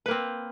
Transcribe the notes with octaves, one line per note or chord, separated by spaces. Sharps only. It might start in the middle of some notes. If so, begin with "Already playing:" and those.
A#3 C4 B4